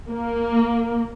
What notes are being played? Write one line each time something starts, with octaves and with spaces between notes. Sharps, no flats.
A#3